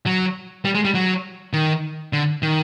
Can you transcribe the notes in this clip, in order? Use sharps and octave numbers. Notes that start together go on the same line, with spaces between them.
F#3
G3
G#3
G3
F#3
D#3
D3
D#3